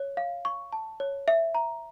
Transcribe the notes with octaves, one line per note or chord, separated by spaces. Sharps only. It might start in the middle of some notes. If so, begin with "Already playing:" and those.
Already playing: C#5
F5
C#6
A5
C#5
E5
A#5